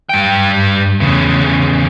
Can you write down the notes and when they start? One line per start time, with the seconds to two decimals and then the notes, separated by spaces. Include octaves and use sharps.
0.09 G2 G5
1.00 E2 C#3